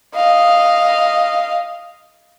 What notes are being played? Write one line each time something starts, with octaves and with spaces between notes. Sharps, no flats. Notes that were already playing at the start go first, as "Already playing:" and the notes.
D#5 F5